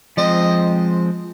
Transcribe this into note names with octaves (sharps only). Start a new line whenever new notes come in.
F3 G#3 C4 D#5